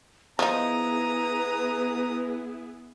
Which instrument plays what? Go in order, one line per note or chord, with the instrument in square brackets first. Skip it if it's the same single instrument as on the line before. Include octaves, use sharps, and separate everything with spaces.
[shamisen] F3 D#4 [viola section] B3 E4 G#4 [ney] B4 [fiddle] A#5 D#6